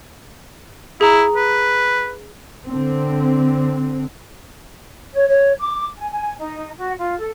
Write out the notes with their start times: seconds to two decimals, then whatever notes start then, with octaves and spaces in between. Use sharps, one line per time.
1.01 E4 G#4 A#5
1.36 B4
2.65 D3 C4
5.13 C#5
5.28 C#5
5.59 D6
5.97 G#5
6.11 G#5
6.37 D#4
6.76 F#4
6.97 F4
7.17 A4